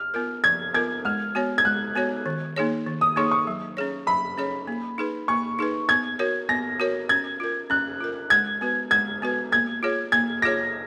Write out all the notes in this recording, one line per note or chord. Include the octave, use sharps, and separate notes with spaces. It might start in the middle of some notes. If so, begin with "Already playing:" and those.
Already playing: F6
B3 F4 A#4
F3 G#6
B3 F4 A#4 G#6
G#3 F6
B3 F#4 C#5
G#6
G#3 F#6
B3 F#4 C#5
D#3
A#3 D#4 G#4 C#5
D#3
D#6
A#3 D#4 G#4 C#5 C#6
C#6
F#3
C#4 G#4 C#5
F#3 B5
C#4 G#4 C#5
A#3
D#4 G#4 B4
A#3 C#6
D#4 G#4 B4
B3 G#6
F#4 A#4 C#5
B3 A#6
F#4 A#4 C#5
C#4 G#6
F4 A#4
C#4 F#6
F4 A#4
G#3 G#6
B3 F#4 B4
G#3 G#6
B3 F#4 B4
A#3 G#6
F4 G#4 C#5
A#3 G#6
F4 G#4 C#5 A#6